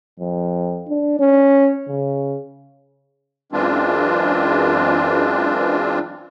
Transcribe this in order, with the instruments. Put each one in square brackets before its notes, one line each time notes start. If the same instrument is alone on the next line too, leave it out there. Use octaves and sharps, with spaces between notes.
[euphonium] F2
D4
C#4
C#3
[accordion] F#2 E3 G#3 C4 D4 F4